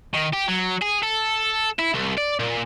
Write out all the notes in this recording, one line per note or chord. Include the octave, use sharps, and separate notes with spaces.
D#3
G4
F#3
G#4
A4
E4
C2
D5
A#2